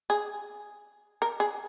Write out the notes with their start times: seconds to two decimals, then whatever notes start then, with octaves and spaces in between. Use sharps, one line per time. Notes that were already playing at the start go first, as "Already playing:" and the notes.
0.10 G#4
1.22 A#4
1.40 G#4